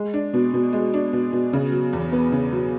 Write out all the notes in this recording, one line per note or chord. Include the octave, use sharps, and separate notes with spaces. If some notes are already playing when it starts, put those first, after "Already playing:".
Already playing: G#3
D4
B2
B2
G#3
D4
B2
B2
C#3
F#3
E2
B3
C#3
F#3